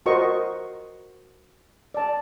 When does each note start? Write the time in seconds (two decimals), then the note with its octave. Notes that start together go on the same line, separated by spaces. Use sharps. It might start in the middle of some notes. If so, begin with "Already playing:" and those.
0.06 F4 F#4 A#4 C5 D#5 C#6
1.94 D5 A5